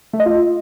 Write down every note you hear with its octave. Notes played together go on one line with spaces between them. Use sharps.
A3
D#5
F4